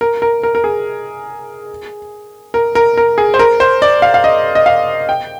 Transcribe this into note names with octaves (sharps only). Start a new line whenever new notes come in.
A#4
A#4
A#4
A#4
G#4
A#4
A#4
A#4
G#4
C5
A#4
C5
D5
F5
F5
D#5
D#5
F5
G5